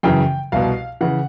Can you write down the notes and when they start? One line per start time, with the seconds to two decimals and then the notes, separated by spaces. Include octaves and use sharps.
0.03 F#2 C#3 E3 G5
0.52 C2 B2 F5
1.01 C#3 E3 F#5